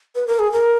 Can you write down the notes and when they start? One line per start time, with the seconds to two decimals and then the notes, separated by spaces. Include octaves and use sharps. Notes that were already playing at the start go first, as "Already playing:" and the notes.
0.15 B4
0.27 A#4
0.39 G#4
0.52 A#4